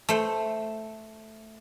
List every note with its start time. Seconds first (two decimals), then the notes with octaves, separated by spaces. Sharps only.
0.09 A3 C5